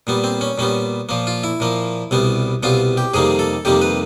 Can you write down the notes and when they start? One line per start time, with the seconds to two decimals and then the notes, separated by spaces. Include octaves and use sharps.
0.07 A#2 G3 B3
0.24 C4
0.41 C#4
0.58 A#2 G3 B3 C#4
1.09 A#2 F3 A#3
1.27 F4
1.44 E4
1.60 A#2 F3 A#3
2.11 C2 B2 G3 B3
2.63 C2 B2 G3 B3 F4
2.97 G4
3.14 F2 C3 D#3 G3 A#3 G#4
3.39 A4
3.65 F2 C3 D#3 G3 A#3 G4
3.82 B4